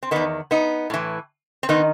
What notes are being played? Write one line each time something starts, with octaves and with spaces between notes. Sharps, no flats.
C4
E2 D#3 B3 D#4
B3 D#4
A2 E3
C4
D#3 B3 D#4